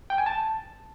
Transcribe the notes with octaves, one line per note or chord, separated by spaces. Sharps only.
G5
G#5
A5